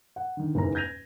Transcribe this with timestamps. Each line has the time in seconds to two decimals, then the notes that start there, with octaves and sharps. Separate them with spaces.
0.16 F#5
0.37 D3 D#3
0.55 F#1 E2 G#2 E3 A#4 A#5
0.75 G6 G#6 A#6 D#7 F7